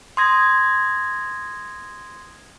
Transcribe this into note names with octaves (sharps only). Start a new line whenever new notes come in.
C6 D#6 G#6 A#6